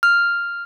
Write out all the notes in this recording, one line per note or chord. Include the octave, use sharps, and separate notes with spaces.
F6